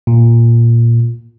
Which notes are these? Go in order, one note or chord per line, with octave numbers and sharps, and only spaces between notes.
A#2